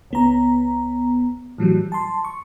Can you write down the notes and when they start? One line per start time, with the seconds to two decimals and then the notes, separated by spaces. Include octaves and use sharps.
0.10 C#2 B3 A#5
1.58 A2 E3 F#3 G3
1.92 A5 C6
2.24 C#6